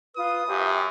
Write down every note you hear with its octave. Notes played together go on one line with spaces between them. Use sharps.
F4 B4 D#6
F#2 G4 E5